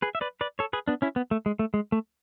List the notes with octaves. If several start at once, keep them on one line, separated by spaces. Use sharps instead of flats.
G#4 B4
E5
B4 D5
B4 D5
A4 C#5
G#4 B4
B3 D4
C#4 E4
B3
A3
G#3
A3
G#3
A3